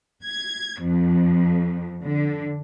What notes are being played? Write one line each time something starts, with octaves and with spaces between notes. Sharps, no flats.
G#6
F2
D3